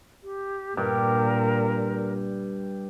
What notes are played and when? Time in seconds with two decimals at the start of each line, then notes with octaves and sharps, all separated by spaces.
0.23 G4
0.77 G2 A#2 G4 A#4